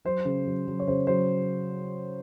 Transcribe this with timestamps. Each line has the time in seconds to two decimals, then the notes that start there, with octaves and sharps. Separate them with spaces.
0.05 F#3 C5
0.25 C#3
0.47 F#3
0.67 F#3
0.80 C#5
0.87 C#3 C5
1.07 F#3 C5